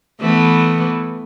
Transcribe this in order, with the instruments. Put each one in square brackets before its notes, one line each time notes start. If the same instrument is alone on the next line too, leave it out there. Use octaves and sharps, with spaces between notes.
[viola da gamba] E3 A3 B3